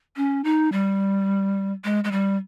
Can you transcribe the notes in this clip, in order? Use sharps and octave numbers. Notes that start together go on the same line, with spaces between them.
C#4
D#4
G3
G#3
G#3
G3